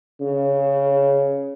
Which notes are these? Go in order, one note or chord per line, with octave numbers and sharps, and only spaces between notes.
C#3